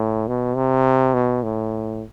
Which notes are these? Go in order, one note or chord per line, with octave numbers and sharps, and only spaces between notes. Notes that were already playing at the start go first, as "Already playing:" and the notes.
Already playing: A2
B2
C3
B2
A2